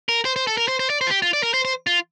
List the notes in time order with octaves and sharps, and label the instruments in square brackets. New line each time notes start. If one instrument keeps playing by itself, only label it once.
[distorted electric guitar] A#4
C5
C5
A4
A#4
C5
C5
D5
C5
F4
G4
F4
D5
A#4
C5
C5
F4